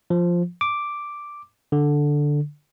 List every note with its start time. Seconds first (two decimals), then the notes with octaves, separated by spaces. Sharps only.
0.10 F3
0.61 D6
1.72 D3